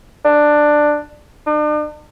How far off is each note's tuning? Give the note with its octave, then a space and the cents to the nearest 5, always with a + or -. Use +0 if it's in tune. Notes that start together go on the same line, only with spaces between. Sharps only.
D4 +10
D4 +40